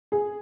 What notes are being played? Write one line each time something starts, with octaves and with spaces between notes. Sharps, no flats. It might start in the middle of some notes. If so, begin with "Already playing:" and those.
G#4